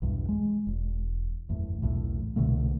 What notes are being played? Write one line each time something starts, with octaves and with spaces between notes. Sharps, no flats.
B1 E2 G2
G#3
E1
F#1 E2 A2
B1 E2 A2
C2 B2 D3 A3